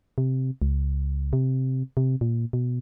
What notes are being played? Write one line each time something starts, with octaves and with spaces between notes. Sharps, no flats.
C3
C#2
C3
C3
A#2
B2